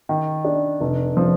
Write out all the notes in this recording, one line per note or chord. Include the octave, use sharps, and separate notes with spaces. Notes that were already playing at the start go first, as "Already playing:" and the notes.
D#3
D4
F1
F3